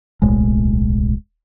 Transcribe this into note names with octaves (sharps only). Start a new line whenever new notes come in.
D1 B1 A2 G#3